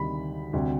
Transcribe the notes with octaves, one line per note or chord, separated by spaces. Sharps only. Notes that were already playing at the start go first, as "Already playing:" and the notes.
Already playing: D2 C3 D#3 G3 B5
D2 C3 G3